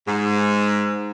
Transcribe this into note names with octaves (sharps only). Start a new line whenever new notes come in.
G#2